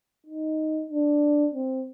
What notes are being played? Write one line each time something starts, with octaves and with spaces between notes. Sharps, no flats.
D#4
D4
C4